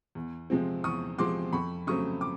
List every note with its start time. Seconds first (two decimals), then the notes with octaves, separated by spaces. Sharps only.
0.15 E2
0.50 C3 F3 G#3 C4
0.84 E2 C#6 D#6
1.18 C3 F3 G#3 C4 C6 D6
1.53 F2 B5 C#6
1.87 C#3 F#3 A3 C4 C#6 D#6
2.21 D6